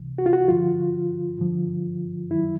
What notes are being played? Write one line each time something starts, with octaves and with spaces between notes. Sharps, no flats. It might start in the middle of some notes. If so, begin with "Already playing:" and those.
Already playing: C#2 C3 E3
F#4
F4
F#4
G2 D3 F3 F4
G2 D3 F3
F#2 D#3 F#3 E4